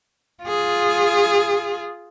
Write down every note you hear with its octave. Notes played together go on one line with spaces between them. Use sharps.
F4 G#4